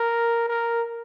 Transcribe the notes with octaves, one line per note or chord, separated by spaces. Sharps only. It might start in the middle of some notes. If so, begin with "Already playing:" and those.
Already playing: A#4
A#4